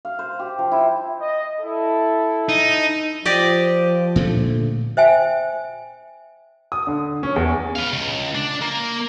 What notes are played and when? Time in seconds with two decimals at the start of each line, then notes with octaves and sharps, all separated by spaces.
0.05 F5
0.19 C5
0.40 G4
0.59 F3
0.72 E4
1.20 D#5
1.59 E4 A4
2.49 D#4
3.25 F3 G4 D5 D#5
4.16 A#2 D3 A3
4.97 C5 E5 G5 G#5
6.72 D#6
6.87 D3
7.23 C#4
7.36 E2
7.76 B4 F5
7.93 C#2
8.35 D4
8.62 A#3